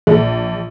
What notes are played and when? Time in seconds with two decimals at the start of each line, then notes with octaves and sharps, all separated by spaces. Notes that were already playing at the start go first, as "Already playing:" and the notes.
0.07 A#1